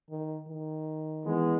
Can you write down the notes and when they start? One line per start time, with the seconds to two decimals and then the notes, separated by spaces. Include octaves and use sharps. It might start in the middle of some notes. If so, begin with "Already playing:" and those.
0.10 D#3
0.49 D#3
1.26 E3 G#3 B3